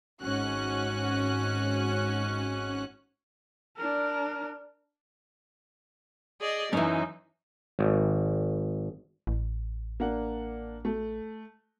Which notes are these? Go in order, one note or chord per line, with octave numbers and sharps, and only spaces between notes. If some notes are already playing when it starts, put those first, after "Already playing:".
G#1 G#2 C#4 F#4 F#6
D4 A#4
G#4 D5 D#5
F#2 E3 C#4 D#4
G#1
A1
A#3 D4 F#5
A3